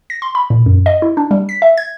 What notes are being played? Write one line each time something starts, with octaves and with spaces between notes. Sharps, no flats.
A#6
C6
B5
A#2
F#2
D#5
E4
D4
G3
B6
E5
G#6